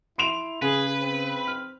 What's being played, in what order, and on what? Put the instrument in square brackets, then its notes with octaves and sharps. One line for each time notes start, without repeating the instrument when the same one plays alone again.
[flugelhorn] E4 [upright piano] C6 D7 F7
[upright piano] C#3 [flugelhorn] G#4 [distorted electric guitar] B4
[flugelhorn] C4
[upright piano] F6